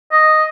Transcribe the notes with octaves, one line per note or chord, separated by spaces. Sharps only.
D#5